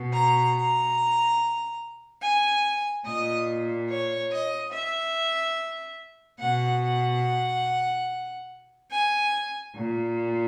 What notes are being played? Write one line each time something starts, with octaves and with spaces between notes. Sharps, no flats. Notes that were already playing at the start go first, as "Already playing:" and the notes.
Already playing: B2
A#5
A#5
G#5
A#2 D#5
C#5
D#5
E5
B2 F#5
F#5
G#5
A#2